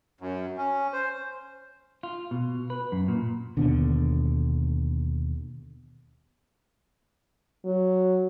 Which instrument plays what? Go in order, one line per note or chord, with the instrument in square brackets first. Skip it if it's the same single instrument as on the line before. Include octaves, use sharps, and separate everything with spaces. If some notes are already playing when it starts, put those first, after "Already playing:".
[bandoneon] F#2
C#4
C5
[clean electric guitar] F4
B2
B4
F#2
A#2
[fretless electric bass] D#2 B2 D3
[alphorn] F#3